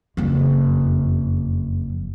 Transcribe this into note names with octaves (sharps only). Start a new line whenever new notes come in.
F#1 F2